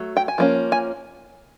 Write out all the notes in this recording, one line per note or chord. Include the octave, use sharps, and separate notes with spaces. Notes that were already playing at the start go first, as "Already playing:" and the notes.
Already playing: F#3 A3
G5
G#5
F3 A#3 C#4
G#5